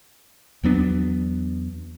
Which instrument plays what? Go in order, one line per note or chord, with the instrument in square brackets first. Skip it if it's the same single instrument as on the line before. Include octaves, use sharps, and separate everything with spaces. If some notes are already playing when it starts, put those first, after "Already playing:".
[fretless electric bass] E2 F#3 B3 D4